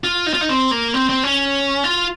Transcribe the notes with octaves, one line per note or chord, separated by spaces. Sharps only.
F4
D#4
F4
D#4
C4
A#3
C4
C4
C#4
F4